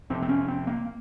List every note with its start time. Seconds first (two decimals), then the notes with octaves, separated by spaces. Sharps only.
0.10 F1 F2 C3 C4
0.23 C4
0.29 C#4
0.48 C4
0.67 A#3